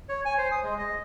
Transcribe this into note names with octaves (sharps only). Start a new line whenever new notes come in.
C#5
G#5
C5
D#6
G#3
D#5